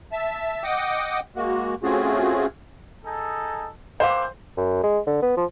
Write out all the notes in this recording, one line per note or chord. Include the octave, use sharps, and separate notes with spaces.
E5 A5
D#5 F#5 G5 D6 D#6
G#3 A#3 F#4
A3 C4 C#4 F4 F#4 G#4
D#4 G#4 A4
E3 A#3 G4 C5 F5
F#2
G#3
D3
B3
F3